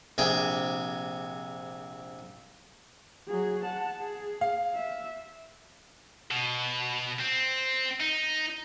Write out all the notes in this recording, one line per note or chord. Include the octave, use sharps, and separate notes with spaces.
A#1 C3 G#4 G5
F#3 G#4
F#5 A5
G#4
F5
E5
B2
C4
D#4